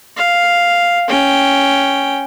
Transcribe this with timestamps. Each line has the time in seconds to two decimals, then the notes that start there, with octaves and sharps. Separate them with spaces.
0.17 F5
1.08 C#4 G5